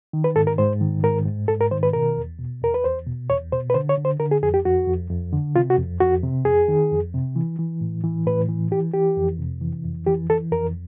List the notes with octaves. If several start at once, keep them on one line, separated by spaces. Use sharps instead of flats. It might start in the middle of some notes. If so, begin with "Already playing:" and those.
D#3
B4
G#2 A4
A#4
G#2 C5
D#3
G#2 A#4
G#2
G#2 A4
A#4
D#3 C5
B4
B2 A#4
E2
B2
E2 A#4
B4
E2 C5
B2
E2 C#5
B2 C5
B4
D3 C5
C#5
D3
C5
D3 A#4
G#4
F2 G#4
G4
F2 F#4
F2
F2
D3
C3 F4
F#4
F2
F2 F#4
C3
F2 G#4
D#3
F2
C3
E3
E3
A2
E3
A2 B4
E3
E3 G4
E3 G4
F2
C3
E3
F2
E3 G4
E3 A4
F2 A#4